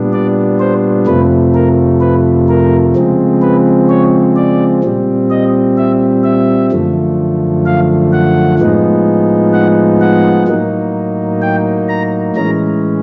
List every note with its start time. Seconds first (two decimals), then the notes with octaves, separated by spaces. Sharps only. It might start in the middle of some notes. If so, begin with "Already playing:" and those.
Already playing: A#2 G3 B3 D4
0.13 D5
0.60 C5
1.07 F2 C3 F3 A3 B4
1.54 A#4
2.01 B4
2.48 A#4
2.95 C#3 F3 G#3 C4
3.42 B4
3.89 C#5
4.36 D5
4.83 A#2 G3 C4
5.30 D#5
5.78 E5
6.24 E5
6.72 F#2 D3 F3 A3
7.66 F5
8.13 F#5
8.59 A2 F3 G#3 B3 D#4
9.54 F#5
10.01 F#5
10.48 A2 F#3 A#3 D#4
11.42 G5
11.89 A#5
12.36 A2 E3 G#3 C#4 A#5